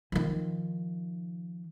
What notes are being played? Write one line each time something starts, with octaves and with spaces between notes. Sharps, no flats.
D#3 F3